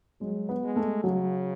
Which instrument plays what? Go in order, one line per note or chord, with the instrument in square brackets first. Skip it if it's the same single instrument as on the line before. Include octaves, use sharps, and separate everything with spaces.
[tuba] F#3 [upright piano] G#3
[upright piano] B3
[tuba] G#3
[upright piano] A3
[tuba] C#3 [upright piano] F#3